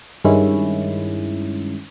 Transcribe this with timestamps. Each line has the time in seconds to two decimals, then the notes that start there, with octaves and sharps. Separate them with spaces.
0.25 G2 D#3 G#3 C#4 E4